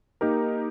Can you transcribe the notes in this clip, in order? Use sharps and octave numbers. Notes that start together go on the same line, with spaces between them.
A#3 D#4 G4 A#4